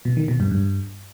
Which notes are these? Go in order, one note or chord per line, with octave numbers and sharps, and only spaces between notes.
B2
D#3
B2
G2
G2